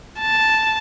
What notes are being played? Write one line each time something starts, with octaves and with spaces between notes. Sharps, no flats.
A5